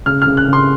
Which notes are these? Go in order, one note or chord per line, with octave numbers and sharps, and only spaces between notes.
C#3 F6
F6
C#3
F#6
C#3 C6